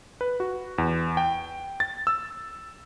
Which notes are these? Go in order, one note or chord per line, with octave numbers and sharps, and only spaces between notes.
B4
F#4
E2
G5
A6
E6